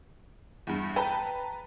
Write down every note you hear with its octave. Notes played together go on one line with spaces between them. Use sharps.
E2 G2
B4 G5 A5 A#5